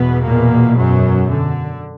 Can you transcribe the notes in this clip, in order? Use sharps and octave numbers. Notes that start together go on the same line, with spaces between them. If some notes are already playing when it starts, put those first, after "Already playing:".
Already playing: E2 B2 B3
A#2 A#3
F#2 F#3
D3